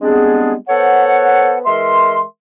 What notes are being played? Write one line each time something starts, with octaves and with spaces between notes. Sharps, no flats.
G3 G#3 B3 C4 D4 G#4
B3 A4 C5 C#5 F#5
E3 G#3 A#4 E5 C6